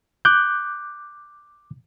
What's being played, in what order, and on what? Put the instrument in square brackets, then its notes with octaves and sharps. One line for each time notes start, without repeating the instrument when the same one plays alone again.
[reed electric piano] D6 F#6 G6